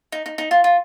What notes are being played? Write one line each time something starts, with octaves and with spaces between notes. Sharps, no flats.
D#4
D#4
D#4
F4
F4